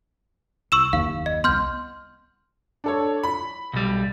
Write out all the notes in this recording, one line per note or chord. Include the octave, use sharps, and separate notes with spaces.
C2 C#6 E6 E7
F#1 D#2 F5
D#5
C2 B3 C6 F6 G6
D4 A4 C#5
B5
B1 G3